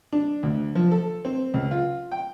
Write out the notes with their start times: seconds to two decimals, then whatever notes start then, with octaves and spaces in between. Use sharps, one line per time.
0.13 D4
0.43 D2
0.75 F3
0.91 A4
1.25 C4
1.54 C#2
1.71 F4
2.12 G5